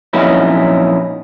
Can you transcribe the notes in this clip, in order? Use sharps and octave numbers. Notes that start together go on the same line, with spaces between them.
F2 A#2 F#3 C#4 D#4 E4